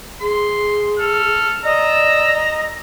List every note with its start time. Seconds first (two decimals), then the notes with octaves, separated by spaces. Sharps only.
0.20 G#4 C6
0.99 A4 F6
1.64 D5 D#5 A#5 E6